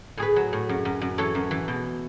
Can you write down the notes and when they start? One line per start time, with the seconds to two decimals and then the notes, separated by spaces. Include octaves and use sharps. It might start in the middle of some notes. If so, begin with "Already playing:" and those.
0.17 A2 G#4 B4
0.36 F#3
0.53 A2
0.69 F#2
0.85 F#2
1.01 F#2
1.18 E3 A4 C#5
1.35 F#2
1.51 E3
1.68 B2